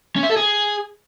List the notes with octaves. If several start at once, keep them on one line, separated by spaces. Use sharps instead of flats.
C#4
E5
A4
G#4